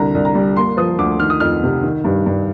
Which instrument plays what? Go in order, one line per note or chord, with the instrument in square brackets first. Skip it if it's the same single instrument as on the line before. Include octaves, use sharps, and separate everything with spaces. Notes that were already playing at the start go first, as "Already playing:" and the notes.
Already playing: [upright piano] C2 D3 A#5
C2
A#5
G3
A#3 C6
F3 D#6
D2 D6
D#3 F6
D#6
F2 F6
C3
D#3
G2
G2